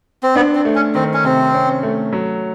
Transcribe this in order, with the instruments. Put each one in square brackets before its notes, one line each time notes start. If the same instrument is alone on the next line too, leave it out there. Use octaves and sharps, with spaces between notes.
[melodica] C4
[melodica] B3 [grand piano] D4
[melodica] C4
[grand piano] A3
[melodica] C#4
[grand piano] D#3 [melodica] C4
[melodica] C#4
[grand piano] C3 [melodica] C4
[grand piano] C#4
A3
F#3